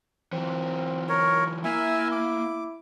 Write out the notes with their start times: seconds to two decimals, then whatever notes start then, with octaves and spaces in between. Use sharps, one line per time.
0.32 E3 F#3 C4
1.09 A#4 C#5
1.65 A#3 E4 E5 G#5
2.12 D6